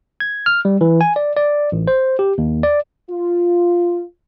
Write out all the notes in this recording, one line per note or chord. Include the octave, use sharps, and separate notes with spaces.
G#6
F6
G3
E3
G#5
D5
D5
A1
C5
G4
D#2
D5
F4